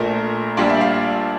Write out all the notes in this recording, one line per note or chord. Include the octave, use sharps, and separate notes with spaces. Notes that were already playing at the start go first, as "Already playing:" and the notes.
Already playing: A#1 A#2 A3 A#4
A#1 A#2 G3 D4 F4 D5
E5
F5